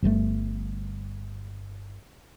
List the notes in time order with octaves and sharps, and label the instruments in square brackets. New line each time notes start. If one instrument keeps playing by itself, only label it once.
[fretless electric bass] G1 G2 D3 A3